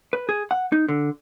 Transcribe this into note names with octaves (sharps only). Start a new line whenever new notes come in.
B4
G#4
F#5
D#4
D3